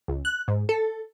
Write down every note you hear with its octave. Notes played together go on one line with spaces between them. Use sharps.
C#2
F#6
G#2
A4